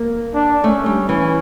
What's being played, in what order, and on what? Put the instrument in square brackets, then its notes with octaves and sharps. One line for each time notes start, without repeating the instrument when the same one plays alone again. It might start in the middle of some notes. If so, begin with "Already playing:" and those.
Already playing: [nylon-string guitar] A#3
[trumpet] D4
[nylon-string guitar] A3 [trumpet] C#4
[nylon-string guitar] G3
[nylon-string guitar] E3 [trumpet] C#4